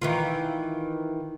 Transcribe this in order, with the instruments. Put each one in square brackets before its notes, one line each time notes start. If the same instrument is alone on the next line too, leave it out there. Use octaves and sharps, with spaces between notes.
[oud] D#3 E3 F4